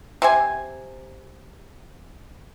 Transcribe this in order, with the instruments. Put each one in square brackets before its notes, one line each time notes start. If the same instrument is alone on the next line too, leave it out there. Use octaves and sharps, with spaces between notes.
[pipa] C3 C5 G#5